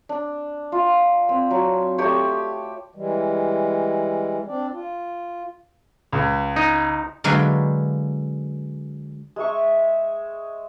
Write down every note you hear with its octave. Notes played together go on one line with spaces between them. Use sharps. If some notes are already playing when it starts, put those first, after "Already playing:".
D4
F4
C4
F#3
A3 G4 C#5
E3 G3 G#3
C4 D4 D5
F4
C#2
D#4
D3 F#3 G#3 B4 F5 G5
G#3 E5 C#6